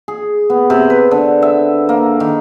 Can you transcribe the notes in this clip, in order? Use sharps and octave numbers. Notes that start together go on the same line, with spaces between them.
G#4
B3
C3
B4
D3
E5
A#3
D#3